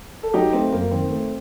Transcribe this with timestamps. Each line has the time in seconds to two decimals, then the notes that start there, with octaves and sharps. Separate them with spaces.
0.23 A4
0.34 F#3 D#4 G4
0.53 A3 C4
0.72 F#2 A#3
0.91 D#3 C4
1.10 A3